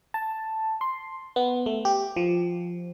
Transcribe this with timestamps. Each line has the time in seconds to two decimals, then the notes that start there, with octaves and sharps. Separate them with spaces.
0.14 A5
0.81 C6
1.36 B3
1.66 A3
1.85 G4
2.16 F3